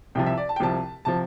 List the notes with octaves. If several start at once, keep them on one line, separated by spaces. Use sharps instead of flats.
C2 C3 F3 G5
E5
D5
A5
G5
C2 C3 F3 A5
C3 F3 A5